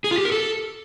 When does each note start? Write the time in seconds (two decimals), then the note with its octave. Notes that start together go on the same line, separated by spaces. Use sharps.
0.04 G#4
0.11 F4
0.18 G4
0.25 A#4
0.32 A4